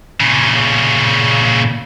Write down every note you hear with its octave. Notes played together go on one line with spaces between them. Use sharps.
A#2 C#3